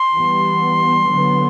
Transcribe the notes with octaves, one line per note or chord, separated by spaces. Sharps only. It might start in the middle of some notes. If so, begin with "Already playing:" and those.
Already playing: C6
E3 G3 B3
D3 F#3 B3